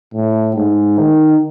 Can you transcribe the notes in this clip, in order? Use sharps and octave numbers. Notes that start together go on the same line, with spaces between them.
A2
G#2
D#3